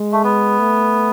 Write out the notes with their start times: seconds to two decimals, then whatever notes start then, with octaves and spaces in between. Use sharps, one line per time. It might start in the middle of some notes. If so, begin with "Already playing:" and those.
Already playing: G#3
0.12 A3
0.24 B3
0.60 A3